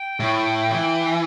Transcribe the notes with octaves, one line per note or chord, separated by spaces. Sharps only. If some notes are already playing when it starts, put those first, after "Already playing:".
Already playing: G5
A2
E3